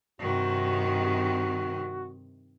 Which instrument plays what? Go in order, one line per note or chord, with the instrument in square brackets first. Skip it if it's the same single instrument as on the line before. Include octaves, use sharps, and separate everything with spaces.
[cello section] G2 C3 D#3 [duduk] F#4